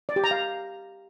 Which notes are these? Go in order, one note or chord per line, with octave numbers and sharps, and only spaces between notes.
D5
G4
A#5
F5